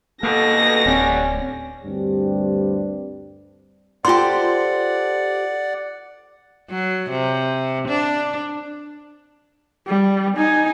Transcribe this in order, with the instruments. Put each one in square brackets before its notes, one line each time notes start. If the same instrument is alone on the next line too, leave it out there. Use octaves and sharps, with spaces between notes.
[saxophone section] D2 B2 [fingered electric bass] A#3 [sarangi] A4 [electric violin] A#6
[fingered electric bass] D1 C4 [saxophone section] D3 G3 [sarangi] C#4
[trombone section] D2 G2 G3 C4 D4 G4
[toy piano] F4 C6 [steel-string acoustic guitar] G4 A4 C5 [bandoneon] D5 F#5
[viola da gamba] F#3
C3
D4
[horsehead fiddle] G3
D#4 G#5